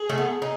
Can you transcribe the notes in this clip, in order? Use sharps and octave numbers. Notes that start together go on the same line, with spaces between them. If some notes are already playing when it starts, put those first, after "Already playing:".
Already playing: G#4
A3
B3
D#4